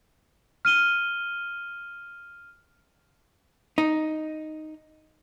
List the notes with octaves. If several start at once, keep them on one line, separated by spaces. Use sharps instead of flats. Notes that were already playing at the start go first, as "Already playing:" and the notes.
F6 D#7 G7
D#4